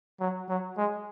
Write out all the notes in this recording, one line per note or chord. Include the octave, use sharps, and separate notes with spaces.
F#3
F#3
G#3